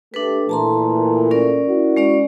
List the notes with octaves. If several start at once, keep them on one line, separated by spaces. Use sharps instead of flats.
A3 D4 G4 A4 B4
A#2 E3 A3 A5 A#5 C6
C#4 A#4 D5
E4 F#4
G#3 C#4 D5